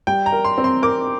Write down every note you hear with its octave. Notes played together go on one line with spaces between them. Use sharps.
G3 G5
A#5
A#4
C6
C4
C6
A#4 D6